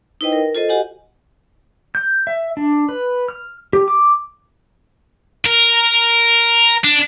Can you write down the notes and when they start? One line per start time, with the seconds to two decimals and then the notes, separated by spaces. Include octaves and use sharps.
0.21 D#4 E4 B4 C5 D#5 G5
0.32 A#4
0.55 F4 A4 C5 D#5
0.69 F#4 G4 D#5 F#5 G#5
1.95 G6
2.27 E5
2.57 D4
2.89 B4
3.29 F6
3.73 G4
3.88 D6
5.46 A#4
6.84 D4